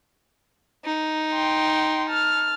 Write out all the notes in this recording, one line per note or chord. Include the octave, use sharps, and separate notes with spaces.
D#4
G5 C6
A5 F6